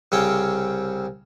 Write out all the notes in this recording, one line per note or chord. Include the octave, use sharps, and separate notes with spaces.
C2 C#3 C4 C#5 G5